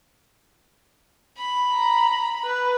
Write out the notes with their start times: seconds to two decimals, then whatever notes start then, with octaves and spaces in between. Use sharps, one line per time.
1.38 B5
1.73 A#5
2.45 B4